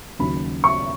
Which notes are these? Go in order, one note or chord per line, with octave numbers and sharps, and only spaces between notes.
D#2 C#3 F#3 B5
C#6